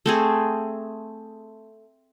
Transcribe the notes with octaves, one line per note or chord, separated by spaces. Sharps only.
A3 C4 G#4